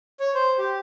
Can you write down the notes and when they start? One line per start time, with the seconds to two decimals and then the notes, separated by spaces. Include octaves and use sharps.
0.20 C#5
0.34 C5
0.58 G4